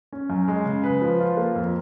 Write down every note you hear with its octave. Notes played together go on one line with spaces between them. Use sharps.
C#4
F#2
G#3
C#3
B4
F3
F4
A#3
F2